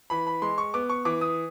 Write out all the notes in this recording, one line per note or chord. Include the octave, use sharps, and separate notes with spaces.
E3 B5
B5
G#3 C6
C#6
B3 D6
C#6
E3 D6
D#6